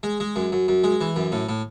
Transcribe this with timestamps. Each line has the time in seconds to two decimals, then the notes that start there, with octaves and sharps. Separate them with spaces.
0.03 G#3
0.20 G#3
0.36 F#2
0.52 F#2
0.68 F#2
0.84 G#3
1.01 E3
1.16 F#2
1.32 A2
1.49 A2